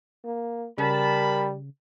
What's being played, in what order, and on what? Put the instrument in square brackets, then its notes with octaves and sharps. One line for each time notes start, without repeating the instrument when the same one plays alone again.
[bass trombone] A#3
[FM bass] C#3 [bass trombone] G3 [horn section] A#4 A5 B5